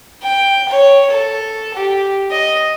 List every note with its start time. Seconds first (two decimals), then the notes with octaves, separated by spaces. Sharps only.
0.22 G5
0.69 C#5
1.10 A4
1.74 G4
2.31 D#5